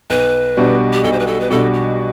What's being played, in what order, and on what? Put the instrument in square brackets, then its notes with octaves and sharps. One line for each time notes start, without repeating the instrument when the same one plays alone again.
[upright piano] B1 [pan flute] B4
[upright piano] B2 G3 D4 F#4
[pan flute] G4
[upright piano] B1 [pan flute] A4
[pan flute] C5
B4
A4
B4
[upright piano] B2 G3 D4 F#4 [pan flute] A4
[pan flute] G4